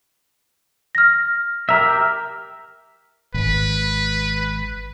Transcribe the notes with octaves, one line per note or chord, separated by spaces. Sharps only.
F6 A#6
G4 A#4 E5 B6
G#1 B4